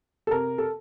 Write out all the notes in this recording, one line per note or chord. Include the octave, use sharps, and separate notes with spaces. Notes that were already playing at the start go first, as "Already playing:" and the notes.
A4
C3 A#4
A4